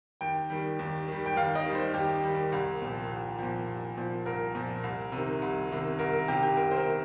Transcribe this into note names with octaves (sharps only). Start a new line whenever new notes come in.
D#2 G5
D#3 G3
D#2
D#3 G3
G5
D#2 F5
D#5
D#3 G3
C5
D#2 G4
D#3 G3
C2
A#2 F3
C2
A#2 F3
C2
A#2 F3
C2 A#4
A#2 F3
C2
C3 D#3
C2
C3 D#3
C2 A#4
A#4
C3 D#3 G4
G4
C2 A#4
C5
A#4
C3 D#3